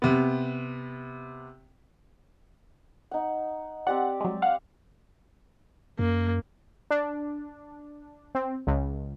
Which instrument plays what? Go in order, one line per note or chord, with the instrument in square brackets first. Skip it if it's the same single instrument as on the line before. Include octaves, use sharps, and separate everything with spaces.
[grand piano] C3 B3
[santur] D#4 F#5
[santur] C4 G4 D5 [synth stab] F#5
[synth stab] F#3 G#3
F5 F#5
[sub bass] F#2 [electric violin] A#3
[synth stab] D4
C4
C#2